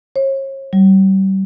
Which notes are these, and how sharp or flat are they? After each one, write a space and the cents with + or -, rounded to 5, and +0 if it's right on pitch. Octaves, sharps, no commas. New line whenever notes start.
C#5 -40
G3 -30